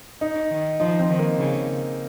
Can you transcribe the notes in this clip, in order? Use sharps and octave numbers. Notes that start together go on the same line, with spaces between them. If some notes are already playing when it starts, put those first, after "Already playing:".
D#4
D#3
F3 D#4
C4
D#3
A#3
C#3